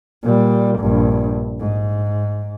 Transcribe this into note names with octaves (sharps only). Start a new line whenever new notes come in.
A#2 G3
A#1 G2
G#2